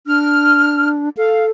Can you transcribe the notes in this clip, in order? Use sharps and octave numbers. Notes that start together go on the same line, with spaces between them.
D4 F6
A4 F5